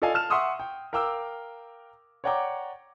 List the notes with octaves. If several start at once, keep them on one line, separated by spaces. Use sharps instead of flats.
F4 A4 D5 D#5 F5 G#5
A5 F6 E7
E5 F#5 C6 C#6 D#6 E6
G5
A#4 F5 G5 D6 E6
C#5 D5 F#5 G5 A#5 D6